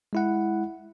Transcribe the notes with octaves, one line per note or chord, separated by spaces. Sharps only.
G#3 E4 F#5